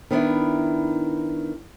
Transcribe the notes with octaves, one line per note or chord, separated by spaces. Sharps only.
D#3 B3 D4 E4